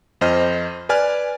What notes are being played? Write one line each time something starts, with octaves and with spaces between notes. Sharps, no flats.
F2 C5 D#5 F6
B4 D5 G#5 F6